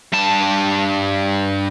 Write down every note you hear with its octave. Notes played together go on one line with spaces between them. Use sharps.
G2 A5